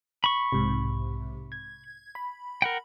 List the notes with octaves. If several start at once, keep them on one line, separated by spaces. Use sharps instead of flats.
B5 C#6
B1 G#2 C3
G#6
B5
A#4 F#5 G5